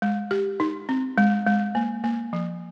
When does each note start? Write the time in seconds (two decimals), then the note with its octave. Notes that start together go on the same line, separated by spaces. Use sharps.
0.02 G#3
0.31 G4
0.60 D#4
0.89 C4
1.18 G#3
1.46 G#3
1.75 A#3
2.04 A#3
2.33 F3